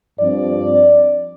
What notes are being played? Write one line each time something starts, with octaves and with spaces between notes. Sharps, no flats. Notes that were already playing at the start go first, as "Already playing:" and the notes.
G2 F3 C4 D5